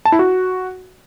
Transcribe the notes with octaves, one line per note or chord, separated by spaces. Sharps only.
A5
E4
F#4